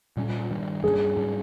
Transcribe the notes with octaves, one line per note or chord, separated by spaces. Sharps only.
A#2 G3 C#4
G2 D#3 G3
G2 G3 C#4 G#4
G#2 G3 C#4